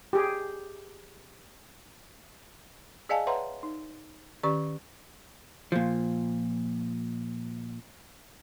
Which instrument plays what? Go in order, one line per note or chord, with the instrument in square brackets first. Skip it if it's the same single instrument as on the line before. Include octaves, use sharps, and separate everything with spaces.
[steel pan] G4 G#4
[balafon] G#4 D5 D#5 F5 G#5 A5
B4 C#5 E5 F#5 A#5 C6
D#4
D#3 C#4 G4 D5 C#6
[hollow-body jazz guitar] A#2 F3